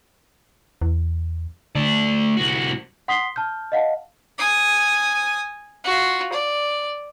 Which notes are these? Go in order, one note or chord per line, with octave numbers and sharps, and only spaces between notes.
E2
D3 A3 D5
C2 F#4
F#5 C6 D#6 B6 C7 G7
A5 F6 G6
D#5 F5 F#5 A5
G#5 D#6
F4 F#4
D5